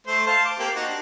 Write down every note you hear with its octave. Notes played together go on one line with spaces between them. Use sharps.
A3 C5
C5 F5 A5
D6
A#3 C4 G4
D#4 F#4
D4